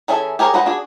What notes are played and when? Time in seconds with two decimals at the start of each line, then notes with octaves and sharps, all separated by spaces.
0.08 E3 C#4 G#4 A4 E5
0.39 G4 G#4 A#4 C5 C#5
0.53 G#3 D#4 B4 C5 F#5
0.66 D4 F#4 G#4